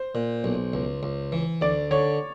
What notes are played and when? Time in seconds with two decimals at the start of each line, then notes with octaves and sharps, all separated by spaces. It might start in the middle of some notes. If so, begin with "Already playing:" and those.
Already playing: C5
0.15 A#2
0.44 B1
0.74 C#2
1.03 C#2
1.32 E3
1.61 D2 D5
1.91 D3 C#5